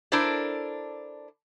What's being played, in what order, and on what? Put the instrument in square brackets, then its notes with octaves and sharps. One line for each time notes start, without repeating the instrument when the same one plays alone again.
[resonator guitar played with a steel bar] D4 E4 A4 A#4 C5 D5